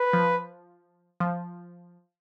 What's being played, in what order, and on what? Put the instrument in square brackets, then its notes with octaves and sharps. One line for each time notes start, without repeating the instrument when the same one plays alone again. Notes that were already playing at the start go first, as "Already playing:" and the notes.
Already playing: [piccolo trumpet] B4
[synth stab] F3
F3